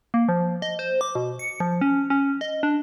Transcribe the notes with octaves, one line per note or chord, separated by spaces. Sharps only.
A#3
F3
D#5
C5
D6
B2
C#7
F3
C#4
C#4
D#5
D4